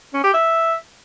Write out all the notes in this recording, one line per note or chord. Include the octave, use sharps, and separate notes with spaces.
C#4
G4
E5